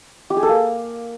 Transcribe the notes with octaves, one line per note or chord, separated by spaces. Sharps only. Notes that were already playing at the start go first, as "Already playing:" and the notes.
G4
G#4
A4
A#3